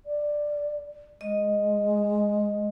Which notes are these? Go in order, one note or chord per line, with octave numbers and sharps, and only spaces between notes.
D5
G#3 D#5